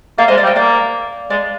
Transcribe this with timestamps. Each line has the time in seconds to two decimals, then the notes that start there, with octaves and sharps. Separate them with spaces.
0.18 A#3 D5 F5
0.28 G#3 C5 D#5
0.37 D5 F5
0.44 G3
0.47 D#5 G5
0.56 A#3 D5 F5
1.30 G#3 D5 F5